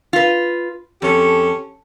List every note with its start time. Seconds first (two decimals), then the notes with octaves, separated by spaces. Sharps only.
0.13 F4 B4
1.02 F2 C#4 G4 A4